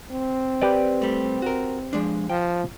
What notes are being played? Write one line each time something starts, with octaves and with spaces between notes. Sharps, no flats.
C4
G4 B4 D5
G3 A3
F#4 A#4
F3 G#3 D4
F3 G5